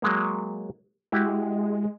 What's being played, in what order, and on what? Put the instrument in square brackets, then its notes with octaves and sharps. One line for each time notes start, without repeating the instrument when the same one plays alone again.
[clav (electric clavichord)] F#3 G#3 A#3
[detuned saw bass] G#3 [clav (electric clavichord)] E4 F#4 G4